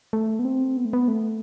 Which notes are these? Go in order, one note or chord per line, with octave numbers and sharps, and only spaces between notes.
A3
B3
C4
B3
A3
B3
A3